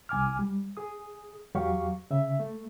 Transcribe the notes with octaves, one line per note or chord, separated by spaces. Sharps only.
C2 G#5 D6 F6
G3
G#4 D#6
E2 F#3 G4 F5 C#6
C#3 E5
A3